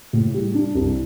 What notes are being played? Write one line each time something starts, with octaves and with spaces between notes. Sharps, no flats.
A2
G3
D4
C2